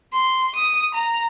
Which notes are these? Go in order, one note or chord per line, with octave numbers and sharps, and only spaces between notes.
C6
D#6
A#5